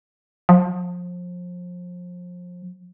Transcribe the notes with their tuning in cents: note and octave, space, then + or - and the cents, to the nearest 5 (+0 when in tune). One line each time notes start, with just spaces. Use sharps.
F3 +30